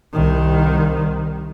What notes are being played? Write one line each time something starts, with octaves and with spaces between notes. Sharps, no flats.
C2 D#3